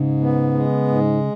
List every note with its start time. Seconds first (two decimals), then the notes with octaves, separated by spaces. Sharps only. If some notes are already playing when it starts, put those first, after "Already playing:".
Already playing: G#2 C#3
0.20 B3
0.54 G#3
0.88 G#2